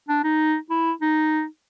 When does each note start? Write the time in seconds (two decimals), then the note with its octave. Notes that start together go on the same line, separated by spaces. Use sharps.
0.09 D4
0.24 D#4
0.70 E4
1.01 D#4